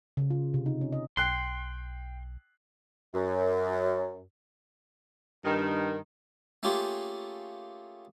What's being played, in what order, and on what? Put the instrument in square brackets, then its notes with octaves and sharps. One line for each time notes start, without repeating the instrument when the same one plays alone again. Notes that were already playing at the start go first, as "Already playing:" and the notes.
[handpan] C#3
F4
C3
D#4
C#4
D#5
[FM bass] B1 [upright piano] G5 F#6 C7 [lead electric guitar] C6
[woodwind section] F#2
[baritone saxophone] G2 [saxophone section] D#3
[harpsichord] A3 A#3 C#4 F4 G4 G#4